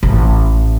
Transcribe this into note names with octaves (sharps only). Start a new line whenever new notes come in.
A1